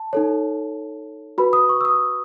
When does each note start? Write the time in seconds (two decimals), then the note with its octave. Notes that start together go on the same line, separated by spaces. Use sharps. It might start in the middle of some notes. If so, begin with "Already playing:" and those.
Already playing: A5
0.13 D#4 A4 C#5
1.38 F#4 B4 B5
1.53 D#6
1.69 C#6
1.81 E6
1.85 D#6